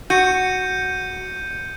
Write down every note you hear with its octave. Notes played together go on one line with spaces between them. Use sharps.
F#4 G6 C#7 D#7